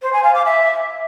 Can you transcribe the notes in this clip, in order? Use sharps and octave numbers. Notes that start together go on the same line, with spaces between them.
C5
G#5
F5
D6
E5